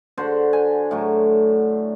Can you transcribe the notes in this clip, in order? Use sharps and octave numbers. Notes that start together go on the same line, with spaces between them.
D3 F#4 C5
G#5
A2 F#3